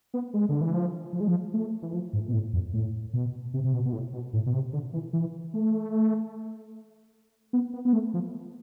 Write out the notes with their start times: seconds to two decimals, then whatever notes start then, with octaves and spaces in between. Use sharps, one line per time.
0.14 B3
0.34 G#3
0.49 D3
0.61 E3
0.74 F3
1.13 F3
1.20 G#3
1.28 F3
1.54 A3
1.82 E3
1.93 F3
2.13 G#2
2.28 B2
2.33 A2
2.53 F2
2.73 A2
3.13 B2
3.54 C3
3.64 C3
3.73 B2
3.86 B2
3.93 A2
4.13 B2
4.33 A2
4.46 B2
4.53 C3
4.73 D3
4.93 E3
5.13 E3
5.54 A3
7.53 B3
7.73 B3
7.85 B3
7.93 A3
8.14 F3